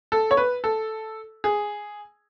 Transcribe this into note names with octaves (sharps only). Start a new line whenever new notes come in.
A4
C#5
B4
A4
G#4